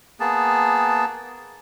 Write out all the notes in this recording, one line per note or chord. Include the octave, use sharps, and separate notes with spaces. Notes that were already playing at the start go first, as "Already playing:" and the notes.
A#3 B3 G#4 A5